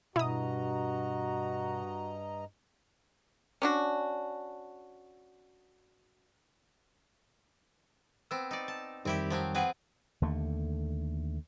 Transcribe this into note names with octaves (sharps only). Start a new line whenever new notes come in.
G2 B2 E4 F#4 D#5 A#5 D#6
C#4 D4 F#4
B3 C4 E6
D#4 D5
A5
F2 D#3 G3 C4 E4 G4
F3 F#3 C4
C4 G#4 B4 E5 F#5 G5
D#2 D3 A3